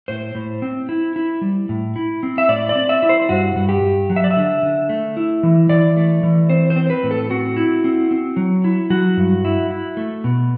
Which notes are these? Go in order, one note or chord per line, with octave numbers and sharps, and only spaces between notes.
A2 C5
A2
C4
E4
E4
G3
A2
E4
C4
E5
A2 D5
D5
C4
E5
E4
C5
G2 F#4
G2
G4
G2
F#3
E5
D5
E5
D3
D3
A3
E4
E3
E3 D5
A3
E3
C4 C5
C5
C4
B4
A2
A4
C4 F#4
E4
C4
C4
F#3
E4
F#3 F#4
G2
E4
E4
A3
B2